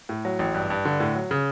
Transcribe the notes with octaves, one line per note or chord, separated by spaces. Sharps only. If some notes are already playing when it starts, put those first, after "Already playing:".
A2
F#3
A1
G2
G2
D3
A2
F#3
C#3